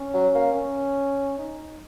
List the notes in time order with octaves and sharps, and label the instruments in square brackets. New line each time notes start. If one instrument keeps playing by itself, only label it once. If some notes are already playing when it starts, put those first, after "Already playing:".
Already playing: [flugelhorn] C#4
[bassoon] F#3
A#3
[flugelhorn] C#4
D#4